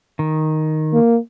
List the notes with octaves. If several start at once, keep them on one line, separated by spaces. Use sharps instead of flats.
D#3
A#3